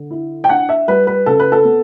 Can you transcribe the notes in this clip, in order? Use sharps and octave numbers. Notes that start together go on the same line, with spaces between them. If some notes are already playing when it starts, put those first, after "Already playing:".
Already playing: D3
E4
G5
D4 F#5
E5
G3 B4
B4
C#3 A4
B4
A4
B3